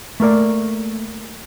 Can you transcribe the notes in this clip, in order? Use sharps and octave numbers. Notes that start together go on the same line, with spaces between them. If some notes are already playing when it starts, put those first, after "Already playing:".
A3 A#3 A#4 D5